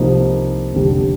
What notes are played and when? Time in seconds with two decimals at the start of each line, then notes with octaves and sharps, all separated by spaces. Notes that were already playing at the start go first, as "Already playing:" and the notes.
Already playing: C2 C3 F3 A#3 D#4
0.73 F1 F2 D3 G3